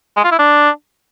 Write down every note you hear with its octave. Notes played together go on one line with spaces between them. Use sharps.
G#3
F4
E4
D4